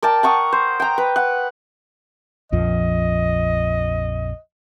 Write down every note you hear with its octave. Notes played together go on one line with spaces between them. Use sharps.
A#4 D5 G5 A5
F#5 A#5 C#6 D#6
C5
G5 A#5
B4
F#5
A#1 F2 F3 D#5